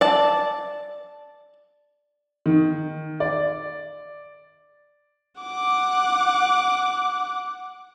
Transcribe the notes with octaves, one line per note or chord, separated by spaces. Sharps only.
D5 A5
D#3
D5
F#5 D6